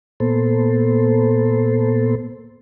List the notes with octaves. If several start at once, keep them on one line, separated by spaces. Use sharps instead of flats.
A#2 A#3 B3 A4 C5